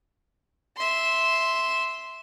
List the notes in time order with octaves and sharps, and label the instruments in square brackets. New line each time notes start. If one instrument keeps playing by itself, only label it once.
[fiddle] E5 C6